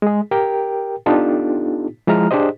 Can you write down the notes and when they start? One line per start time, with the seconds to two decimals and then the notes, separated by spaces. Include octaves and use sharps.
0.02 G#3 G#4
0.31 G4 A#4 G5
1.06 B3 D4 D#4 F4 G4 A4
2.07 F3 G#3 E4 A#5 F6
2.31 D4 G4 G#4 C5 D#5